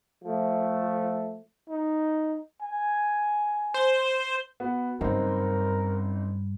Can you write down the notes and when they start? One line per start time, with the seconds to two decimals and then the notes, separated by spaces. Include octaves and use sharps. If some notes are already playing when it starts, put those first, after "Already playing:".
0.24 F3 A3
1.70 D#4
2.62 G#5
3.74 C5
4.60 B3 F#4
5.01 F#1 G2 C4 D#4 A#4